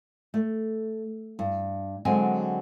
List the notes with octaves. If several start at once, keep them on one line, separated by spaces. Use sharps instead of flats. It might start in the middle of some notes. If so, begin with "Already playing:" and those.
A3
G2
D3 F#3 G#3 C4 G#5